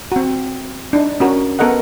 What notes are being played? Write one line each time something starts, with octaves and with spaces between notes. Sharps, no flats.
C4 F#4
D4 D#4
C#4 F#4 A#4
B3 A4 A#4 D#5 F#5